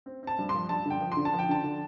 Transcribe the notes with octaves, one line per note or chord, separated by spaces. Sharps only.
C4
C4 A5
G2
C6
F3
G2 A5
D3 G5
F3
C6
D3
A5
F3
G5
D3 A5
D3